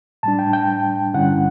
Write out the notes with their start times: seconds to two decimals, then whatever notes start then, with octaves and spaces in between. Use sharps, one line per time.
0.23 A2 G3 D4 A5
0.39 G5
0.53 G5
1.14 G2 D3 G3 C#4 E4 F#5